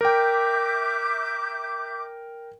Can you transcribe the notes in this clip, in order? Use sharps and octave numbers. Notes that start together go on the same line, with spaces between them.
A#4 E5 G5 D6 G6